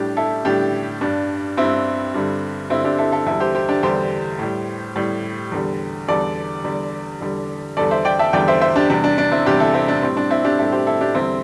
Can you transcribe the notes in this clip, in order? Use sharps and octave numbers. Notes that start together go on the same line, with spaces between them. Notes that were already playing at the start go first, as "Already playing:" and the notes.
Already playing: A2 G3 D4 G4
E4 A4
A2 G3 D4 G4
G2 G3 D4
G2 G3 C4 E4
G2 D3 G3
G2 D3 G3 C4 E4
D4 G4
E4 A4
E4 A4
E2 D3 G3 E4 A4
G4 C5
G4 C5
D4 G4
E2 D3 G3 G4 C5
A2 G3
A2 G3
E2 D3 G3
E2 D3 G3 A4 D5
E2 D3 G3
E2 D3 G3
E2 D3 G3 A4 D5
C5 E5
D5 G5
E5 A5
E2 D3 G3 D5 G5
C5 E5
C5 E5
D4 G4
E2 C3 G3 D4
D4
D4
C4 E4
E2 C3 G3 D4 G4
E4 A4
C4 E4
D4
A2 G3 C4
D4
C4 E4
D4 G4
A2 G3 E4 A4
G4 C5
E4 A4
D4 G4
E2 D3 G3 C4 E4